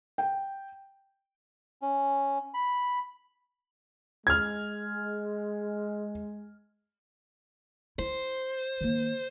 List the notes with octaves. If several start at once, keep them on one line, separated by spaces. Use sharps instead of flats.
G5
C#4
B5
G#3 F6 G#6
E4 C5
D#3 A#3